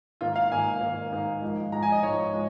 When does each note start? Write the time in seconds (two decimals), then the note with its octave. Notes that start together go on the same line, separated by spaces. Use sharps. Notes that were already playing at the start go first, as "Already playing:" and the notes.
0.21 G#2 D#3 A#3 F4
0.36 F5
0.51 G#2 D#3 A#3 G#5
0.81 G#2 D#3 A#3
1.12 G#2 D#3 A#3
1.42 G#2 F3 G#3
1.72 G#2 F3 G#3 A#5
1.83 G#5
1.92 D#5
2.03 G#2 F3 G#3 C#5
2.33 F3 G#3